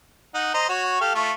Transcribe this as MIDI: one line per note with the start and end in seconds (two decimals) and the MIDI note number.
0.34 0.52 63
0.34 0.52 78
0.54 0.67 72
0.54 0.67 75
0.54 0.67 82
0.69 0.99 66
0.69 0.99 73
0.69 0.99 85
1.01 1.13 67
1.01 1.13 69
1.01 1.13 77
1.15 1.31 57
1.15 1.31 65
1.15 1.31 85